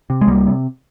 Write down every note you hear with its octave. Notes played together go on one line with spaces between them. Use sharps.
C3
G#3
C2 G3 A#3
C3